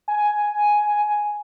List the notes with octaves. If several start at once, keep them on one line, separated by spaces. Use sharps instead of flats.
G#5